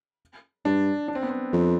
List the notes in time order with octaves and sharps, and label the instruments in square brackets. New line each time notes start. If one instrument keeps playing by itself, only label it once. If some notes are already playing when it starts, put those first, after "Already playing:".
[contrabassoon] G2 [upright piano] D4
[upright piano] D4
C4
B3
C4
[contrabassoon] F2